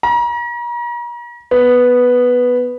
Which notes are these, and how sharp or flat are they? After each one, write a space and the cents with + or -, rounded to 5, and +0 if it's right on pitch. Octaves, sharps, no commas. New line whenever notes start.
A#5 +40
B3 +0